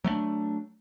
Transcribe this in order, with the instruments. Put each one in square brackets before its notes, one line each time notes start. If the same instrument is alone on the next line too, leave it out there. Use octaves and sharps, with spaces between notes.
[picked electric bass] F#3 A3 B3 D4